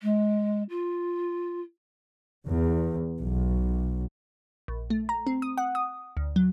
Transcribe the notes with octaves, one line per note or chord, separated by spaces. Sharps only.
G#3
F4
E2
B1
A#1
A3
A#5
C4
D#6
F#5
D#6
D2
F#3